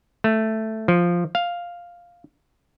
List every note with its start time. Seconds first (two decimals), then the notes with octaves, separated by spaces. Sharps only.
0.24 A3
0.88 F3
1.35 F5